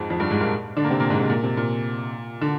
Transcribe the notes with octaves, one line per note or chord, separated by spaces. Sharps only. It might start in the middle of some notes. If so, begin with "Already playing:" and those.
Already playing: F2 G#2 F3 G#3
F2 F3
G2 G3
G#2 G#3
A#2 A#3
D3 D4
A#3
C3 C4
A#2 A#3
G#2 G#3
C3
A#2
C3
A#2
D3